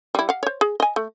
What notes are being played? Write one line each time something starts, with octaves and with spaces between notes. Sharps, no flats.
G3 E4
F5 F#5
C5 C#5
G#4
D#5 G#5
A3